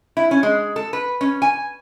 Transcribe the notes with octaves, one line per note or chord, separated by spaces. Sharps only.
E4
C#4
G#3
A4
B4
C#4
G#5